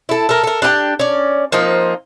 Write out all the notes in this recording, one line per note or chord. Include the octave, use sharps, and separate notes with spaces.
E4 A4
A4 A#4
A4 A#4
D4 G4 A4 G5
C#4 D5
F3 A#3 C4 D#4